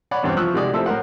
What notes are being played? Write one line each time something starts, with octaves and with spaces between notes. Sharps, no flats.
C#5 D5 F#5 B5
E2 G2 E3 C4
F3 E4 C#6 D#6 E6 F#6
C3 D#3 G#3 F#4 D5 D#6
F3 A3 C4 E4 G4 A4
A2 C4 A#4 C5 F#5